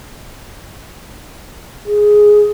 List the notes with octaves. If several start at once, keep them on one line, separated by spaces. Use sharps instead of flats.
G#4